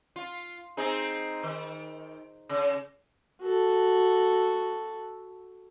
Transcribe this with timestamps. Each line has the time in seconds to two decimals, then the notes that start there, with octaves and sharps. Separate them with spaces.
0.16 F4
0.77 C4 D#4 G#4
1.43 D#3
2.49 C#3
3.42 F#4 A4